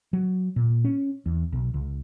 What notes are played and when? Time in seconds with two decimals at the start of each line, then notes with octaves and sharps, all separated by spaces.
0.13 F#3
0.56 A#2
0.84 C#4
1.26 E2
1.53 B1
1.74 C#2